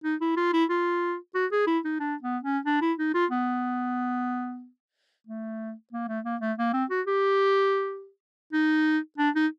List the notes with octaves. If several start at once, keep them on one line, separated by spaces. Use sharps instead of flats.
D#4
E4
F4
E4
F4
F#4
G#4
E4
D#4
D4
B3
C#4
D4
E4
D#4
F4
B3
A3
A#3
A3
A#3
A3
A#3
C4
F#4
G4
D#4
D4
D#4